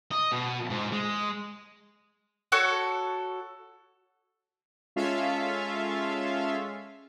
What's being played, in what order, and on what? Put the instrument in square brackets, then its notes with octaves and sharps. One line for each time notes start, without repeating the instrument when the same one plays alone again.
[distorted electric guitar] D#5
B2
G#2
G#3
[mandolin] F#4 A4 C#5
[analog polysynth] G#3 C#4 F4 A4 E5 F5